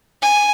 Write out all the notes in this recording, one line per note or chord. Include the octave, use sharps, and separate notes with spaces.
G#5